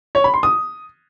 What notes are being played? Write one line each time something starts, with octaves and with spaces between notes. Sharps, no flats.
C#5
B5
C6
D#6